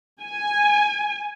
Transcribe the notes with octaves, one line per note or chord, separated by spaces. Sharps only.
G#5